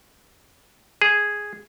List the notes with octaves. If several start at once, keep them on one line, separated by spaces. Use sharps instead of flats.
G#4